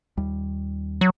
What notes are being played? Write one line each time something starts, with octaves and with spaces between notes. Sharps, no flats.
D#2 G3
F#3